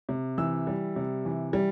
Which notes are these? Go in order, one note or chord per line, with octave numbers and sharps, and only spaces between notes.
C3
E3 E6
G3
C3
E3
G3